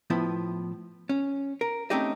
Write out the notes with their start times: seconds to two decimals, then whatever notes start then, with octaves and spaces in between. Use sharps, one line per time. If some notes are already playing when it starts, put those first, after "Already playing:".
0.10 A2 F3 B3 E4
1.09 C#4
1.61 A#4
1.90 A3 C4 C#4 D#4 G4 D#5